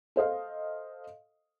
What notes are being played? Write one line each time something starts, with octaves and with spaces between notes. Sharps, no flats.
A4 C5 D#5 F5